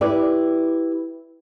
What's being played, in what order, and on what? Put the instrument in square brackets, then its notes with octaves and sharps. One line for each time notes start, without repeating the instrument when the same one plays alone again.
[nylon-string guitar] E4 G4 B4 D5